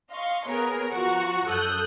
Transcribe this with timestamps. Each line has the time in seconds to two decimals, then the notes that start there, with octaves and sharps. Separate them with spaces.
0.10 D#5 F5 C6 C#6
0.45 B3 G#4 A#4 B4 C#5 G#5
0.89 F3 F#4 F#5 A#5 C#6
1.48 F#2 A4 D#6 F#6 G6